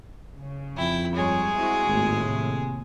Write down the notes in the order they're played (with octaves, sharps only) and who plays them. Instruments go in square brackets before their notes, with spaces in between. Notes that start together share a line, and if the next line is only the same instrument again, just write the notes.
[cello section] C#3
[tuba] F2 [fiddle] E4 G5
[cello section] G2 G3 C#5 [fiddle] G#3 G#4
[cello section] C4 E4 F#4
[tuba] G#1 [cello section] D#2 A2
[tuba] C3